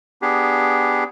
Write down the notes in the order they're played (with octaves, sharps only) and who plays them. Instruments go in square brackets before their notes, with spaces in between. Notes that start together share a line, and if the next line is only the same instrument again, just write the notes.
[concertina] B3 D4 G4 G#4